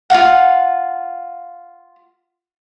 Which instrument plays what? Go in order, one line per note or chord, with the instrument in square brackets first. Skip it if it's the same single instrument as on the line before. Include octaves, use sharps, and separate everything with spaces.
[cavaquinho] F4 F#4 F5 F#5